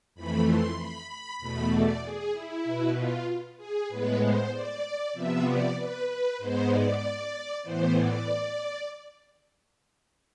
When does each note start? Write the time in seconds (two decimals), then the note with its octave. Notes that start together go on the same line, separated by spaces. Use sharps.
0.15 F2 E3 A3 B5
0.45 C6
0.77 B5
1.08 B5
1.38 E2 B2 A3 B5
1.71 D5
2.02 G#4
2.32 E4
2.64 B2 B3
2.95 F4
3.57 G#4
3.89 A2 G#3 B3 B4
4.20 C5
4.51 D5
5.13 C3 F3 B3 E5
5.45 D5
5.75 B4
6.07 B4
6.38 G#2 G#3 B3 C5
6.69 D5
7.62 A2 E3 B3 C5
7.94 D5